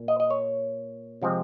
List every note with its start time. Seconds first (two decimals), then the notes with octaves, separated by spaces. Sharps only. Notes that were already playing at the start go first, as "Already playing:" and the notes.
Already playing: A#2
0.08 D#5
0.20 D#5
0.31 C#5
1.22 C3 F3 G#3 C4